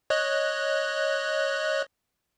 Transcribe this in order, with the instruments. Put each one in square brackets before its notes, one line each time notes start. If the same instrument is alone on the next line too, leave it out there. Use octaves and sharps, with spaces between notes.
[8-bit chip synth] C#5 D#5 F#6